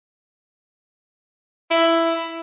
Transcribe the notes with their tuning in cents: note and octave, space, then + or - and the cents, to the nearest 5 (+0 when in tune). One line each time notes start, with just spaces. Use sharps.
E4 +10